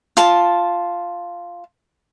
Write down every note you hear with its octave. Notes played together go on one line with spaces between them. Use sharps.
F4 A5